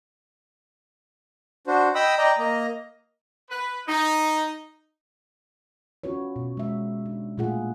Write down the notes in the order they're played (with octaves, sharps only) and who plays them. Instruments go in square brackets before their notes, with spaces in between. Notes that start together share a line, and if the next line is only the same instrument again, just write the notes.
[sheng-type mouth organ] D4 F#4 C5
D#5 G5 B5 D#6 E6
D5 D#5 G5 A#5
A#3 D#5 A#5
[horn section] B4
D#4
[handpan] C#4 F4 F#4 B4 C#5
B2
G#3 E5
D4
A#2 A3 F4 G#4 F#5